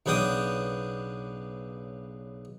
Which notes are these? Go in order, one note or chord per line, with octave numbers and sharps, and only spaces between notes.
B1 C#3 B3 D4 G5 D#6